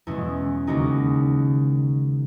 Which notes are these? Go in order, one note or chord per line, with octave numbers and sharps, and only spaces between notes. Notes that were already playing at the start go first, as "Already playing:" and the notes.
E2 B2 G#3 C#4 E4
D#2 C#3 G#3 D#4 F#4